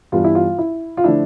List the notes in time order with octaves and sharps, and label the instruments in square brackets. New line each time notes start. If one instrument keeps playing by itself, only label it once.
[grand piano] G2 E3 G3 B3 [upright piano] F4
[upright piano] E4
F4
E4
F4
[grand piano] D3 F3 A3 D4 [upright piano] E4